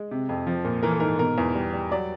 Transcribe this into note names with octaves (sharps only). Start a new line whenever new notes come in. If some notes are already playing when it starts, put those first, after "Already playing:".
Already playing: G#3
C3
F2
F3
A#2
E3 A#4
A4
G#2 A#4
B2 A#4
E2
G3
G3
F#3 D5